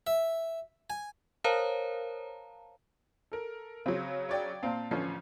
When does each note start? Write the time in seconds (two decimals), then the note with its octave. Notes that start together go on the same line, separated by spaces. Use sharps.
0.07 E5
0.90 G#5
1.44 A#4 C5 C#5 F5 A5 A#5
3.32 A4 A#4
3.86 C#3 F#3 C4
4.29 C#5 D5 G5
4.63 A#2 C4 F5 A5
4.91 A1 D3 F3 C#4 C7